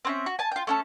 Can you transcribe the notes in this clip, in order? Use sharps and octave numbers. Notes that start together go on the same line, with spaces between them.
C4 C#4 E5
F#4
G#5 A5
F4 G5
A3 C#4 A4